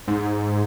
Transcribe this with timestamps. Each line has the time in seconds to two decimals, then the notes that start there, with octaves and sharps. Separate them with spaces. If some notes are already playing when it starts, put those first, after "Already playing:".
0.08 G#2